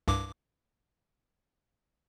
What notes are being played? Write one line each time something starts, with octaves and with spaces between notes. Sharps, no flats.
C2 G2 D6